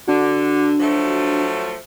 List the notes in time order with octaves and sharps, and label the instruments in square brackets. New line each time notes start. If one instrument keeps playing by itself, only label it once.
[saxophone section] D3 [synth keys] D4 F#4
[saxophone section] F3 F#3 A3